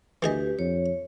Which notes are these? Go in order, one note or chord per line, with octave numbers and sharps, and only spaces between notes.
D2 E3 G4 G#4 B4 D#5
F2 C#5